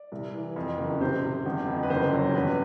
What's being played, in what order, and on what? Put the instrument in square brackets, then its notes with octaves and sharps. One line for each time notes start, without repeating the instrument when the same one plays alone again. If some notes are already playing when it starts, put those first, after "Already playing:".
Already playing: [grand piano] D5
C2
E3
F2
F#1
C3 C5
C3
G1
F2
B4
F#1 C5
F#3
G1 B4